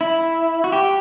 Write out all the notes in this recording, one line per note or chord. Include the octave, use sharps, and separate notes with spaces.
E4
F#4
G4